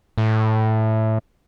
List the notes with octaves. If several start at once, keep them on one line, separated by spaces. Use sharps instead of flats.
A2